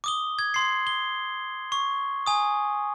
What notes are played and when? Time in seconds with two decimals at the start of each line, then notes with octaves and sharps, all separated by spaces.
0.04 D6 D#6 G7
0.39 G#6
0.54 C6 C7
0.87 G7
1.72 C#6
2.26 G#5 D#6